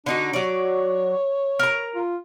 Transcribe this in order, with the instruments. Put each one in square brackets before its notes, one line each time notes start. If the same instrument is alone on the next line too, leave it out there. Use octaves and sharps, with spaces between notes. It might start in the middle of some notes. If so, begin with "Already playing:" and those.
[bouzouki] D3 D#4 F#4 [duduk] D4
[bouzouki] F#3 D5 [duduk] C#5
[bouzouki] A#4 A#5
[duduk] F4